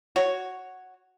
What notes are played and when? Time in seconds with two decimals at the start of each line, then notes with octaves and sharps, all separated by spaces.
0.16 F#4 C#5